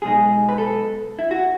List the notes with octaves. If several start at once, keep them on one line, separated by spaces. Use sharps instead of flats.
B1 B2 G#3 D#4 G#4
B4
A4
E4
F#4